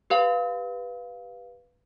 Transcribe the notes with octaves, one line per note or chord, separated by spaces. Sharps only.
G4 B4 F5